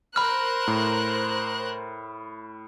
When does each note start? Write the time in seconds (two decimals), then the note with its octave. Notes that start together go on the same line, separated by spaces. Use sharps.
0.16 A#4 C5 B5 F6 F#6
0.68 A2